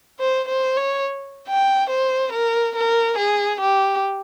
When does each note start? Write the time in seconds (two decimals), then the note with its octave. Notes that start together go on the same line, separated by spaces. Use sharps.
0.20 C5
0.48 C5
0.77 C#5
1.48 G5
1.90 C5
2.32 A#4
2.76 A#4
3.18 G#4
3.61 G4